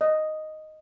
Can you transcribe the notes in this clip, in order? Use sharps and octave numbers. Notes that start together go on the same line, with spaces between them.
D#5